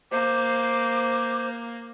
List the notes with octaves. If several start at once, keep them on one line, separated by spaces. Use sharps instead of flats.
A#3 C5 D6